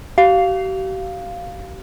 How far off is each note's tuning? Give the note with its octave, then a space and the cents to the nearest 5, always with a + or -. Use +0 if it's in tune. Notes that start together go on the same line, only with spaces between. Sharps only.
G4 -45 F5 +0